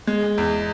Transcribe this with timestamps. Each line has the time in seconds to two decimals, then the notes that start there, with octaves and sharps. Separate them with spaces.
0.07 G#3
0.38 E2